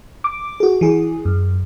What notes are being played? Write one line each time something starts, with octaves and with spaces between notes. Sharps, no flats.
D6
F#4 G#4
E3 G#4
F#2